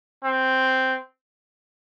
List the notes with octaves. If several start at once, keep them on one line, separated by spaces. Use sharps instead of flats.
C4